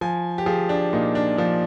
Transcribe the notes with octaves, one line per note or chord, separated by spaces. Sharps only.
F3 G#5
G4
F3 G#4
D4
A#2 D#4
D4
F3 D4